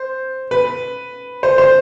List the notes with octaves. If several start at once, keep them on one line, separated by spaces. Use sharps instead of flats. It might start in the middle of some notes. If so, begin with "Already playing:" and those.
Already playing: C5
B4
C5
C5